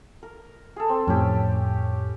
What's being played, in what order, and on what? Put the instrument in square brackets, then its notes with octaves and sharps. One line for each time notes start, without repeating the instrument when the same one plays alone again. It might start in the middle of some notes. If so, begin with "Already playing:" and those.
[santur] A#4
G#4 A4
C4
[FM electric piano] F2 A2 [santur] C#4 G4